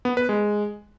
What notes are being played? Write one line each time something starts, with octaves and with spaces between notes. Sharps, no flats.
B3
B4
G#3